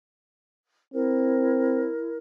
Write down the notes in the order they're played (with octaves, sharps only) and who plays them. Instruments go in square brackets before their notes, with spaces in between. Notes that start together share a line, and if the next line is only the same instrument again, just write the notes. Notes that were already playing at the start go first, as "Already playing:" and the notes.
[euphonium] C4 [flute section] E4 A#4